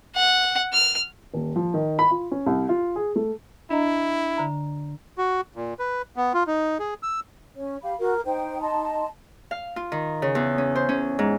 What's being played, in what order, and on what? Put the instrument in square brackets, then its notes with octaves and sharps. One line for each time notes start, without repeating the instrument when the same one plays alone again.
[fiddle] F#5
F6
[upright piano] D#1
F3
D#3
B5
F4
C#4
C2
F4
G#4
A3
[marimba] D4 D#5 A#5 [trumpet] E4
[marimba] D3 A#5
[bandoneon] F#4
A#2
B4
B3
F4
D#4
G#4
E6
[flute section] C#4 C#5
G4 F5 B5
[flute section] F#4 [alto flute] A#4
[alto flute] D#4 [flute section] C5 G5
[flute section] D#5 A5 C6
[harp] F5
F4
D#3
C#3
E2
C#4
C5
C#4
G#2